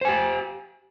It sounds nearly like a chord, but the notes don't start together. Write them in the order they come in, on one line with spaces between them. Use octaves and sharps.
C5 G#5 G4